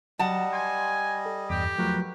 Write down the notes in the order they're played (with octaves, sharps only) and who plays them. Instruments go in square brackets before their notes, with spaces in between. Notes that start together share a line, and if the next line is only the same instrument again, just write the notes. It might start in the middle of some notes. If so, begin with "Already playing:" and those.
[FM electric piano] F#3 [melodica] G3 D#5 [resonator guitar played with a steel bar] F#5 A5
[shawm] G#5 [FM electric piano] C6 G#6
[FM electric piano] A4
[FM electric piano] E2 G2 [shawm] G4
[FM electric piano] F3 F#3 A3 [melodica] F#4 A#4 B4